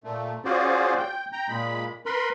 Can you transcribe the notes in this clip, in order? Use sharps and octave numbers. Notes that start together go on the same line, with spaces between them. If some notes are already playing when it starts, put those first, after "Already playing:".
A#2 A3
C#4 F4 F#4 G#4 C5 D5
G5
G5 A#5
A#2 G#3 B5
A#4 B4 B5 C6